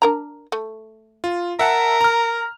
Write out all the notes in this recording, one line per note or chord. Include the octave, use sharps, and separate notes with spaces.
D4 A#4 A#5
A3
F4
A#4 E5 F#5 A5
A#5 F6